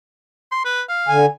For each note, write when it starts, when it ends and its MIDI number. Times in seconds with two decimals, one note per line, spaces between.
0.52 0.65 84
0.65 0.82 71
0.89 1.18 77
1.09 1.26 50
1.09 1.26 80